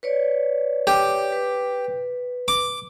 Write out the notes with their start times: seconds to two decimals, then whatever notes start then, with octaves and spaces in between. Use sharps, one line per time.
0.03 B4 C#5 D5
0.87 G4
1.32 B4
2.48 D6